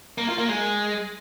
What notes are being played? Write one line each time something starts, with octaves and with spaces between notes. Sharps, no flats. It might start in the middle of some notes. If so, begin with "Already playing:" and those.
A#3
F4
A#3
G#3